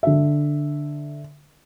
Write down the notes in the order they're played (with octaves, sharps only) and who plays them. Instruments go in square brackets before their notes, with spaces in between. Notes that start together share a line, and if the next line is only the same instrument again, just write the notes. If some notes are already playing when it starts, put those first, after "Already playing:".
[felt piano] D3 E5